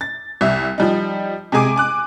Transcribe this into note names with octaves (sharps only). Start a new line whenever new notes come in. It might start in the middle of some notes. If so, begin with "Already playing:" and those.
A6
C2 E5
F3 G3 D#4
C3 G#3 G#4 G#5 D6 D7
G#5 D6 F#6